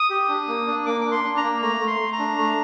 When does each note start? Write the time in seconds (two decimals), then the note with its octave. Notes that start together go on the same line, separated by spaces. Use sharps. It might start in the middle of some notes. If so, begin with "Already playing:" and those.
Already playing: D#6
0.10 G4
0.28 D4
0.48 A#3
0.67 D4
0.86 A#3 D6
1.01 D4 D6
1.11 C6
1.24 D4
1.37 A#5
1.43 A#3
1.62 A3 A#5
1.81 A3
1.87 C6
2.00 A3
2.13 A#5
2.19 D4
2.38 A3